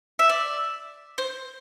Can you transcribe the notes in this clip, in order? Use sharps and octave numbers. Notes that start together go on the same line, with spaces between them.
E5
D5
C5